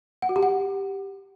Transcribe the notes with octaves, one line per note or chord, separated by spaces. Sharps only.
F#5
F#4
G4
F#5